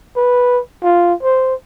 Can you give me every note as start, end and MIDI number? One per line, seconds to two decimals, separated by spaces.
0.16 0.60 71
0.83 1.14 65
1.23 1.54 72